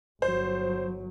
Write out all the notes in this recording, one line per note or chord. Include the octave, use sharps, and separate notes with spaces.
G1 F#3 C5